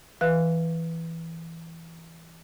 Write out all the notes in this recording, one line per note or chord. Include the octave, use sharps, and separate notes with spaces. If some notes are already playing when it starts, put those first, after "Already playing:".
E3 B4 F5 F#6